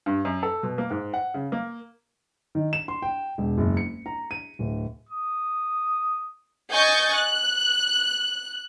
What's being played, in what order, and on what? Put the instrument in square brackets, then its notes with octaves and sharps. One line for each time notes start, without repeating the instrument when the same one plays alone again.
[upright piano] G2
F#2
A4
B2
A#3
G#2
F#5
C#3
A#3
[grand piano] D#3
E7
C6
G5
E1
F#1
C#7
A#5
D#7
D1
[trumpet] D#6
[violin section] D#5 G#5 C#6 G6 A6
F#6